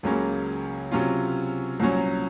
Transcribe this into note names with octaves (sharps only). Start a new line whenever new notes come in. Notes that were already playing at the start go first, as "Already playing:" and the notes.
C#2 C#3 F#3 A#3 C#4
C3 F#3 C#4 F4
C2 A#2 F#3 C#4